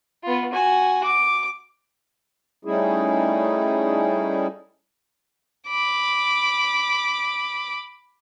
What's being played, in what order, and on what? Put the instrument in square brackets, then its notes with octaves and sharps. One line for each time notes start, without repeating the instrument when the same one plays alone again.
[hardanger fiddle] B3 F4
F#4 G#5
D6
[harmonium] G3 A3 C#4 D#4 E4 G#4
[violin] B5 D6